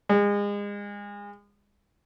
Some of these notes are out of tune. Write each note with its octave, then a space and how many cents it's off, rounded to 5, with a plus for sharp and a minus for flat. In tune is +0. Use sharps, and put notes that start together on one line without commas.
G#3 -30